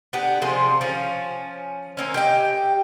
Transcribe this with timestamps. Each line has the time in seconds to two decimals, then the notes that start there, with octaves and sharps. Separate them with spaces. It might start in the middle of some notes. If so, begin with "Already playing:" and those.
0.13 B3 D4 G4
0.42 C3 F3 G#4 C5
0.81 F3 C#4
1.97 A#3 C4 C#4
2.14 G4 D#5 G5